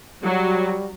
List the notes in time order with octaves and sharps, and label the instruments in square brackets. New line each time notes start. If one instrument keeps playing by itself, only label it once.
[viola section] F#3 F#4 [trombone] G3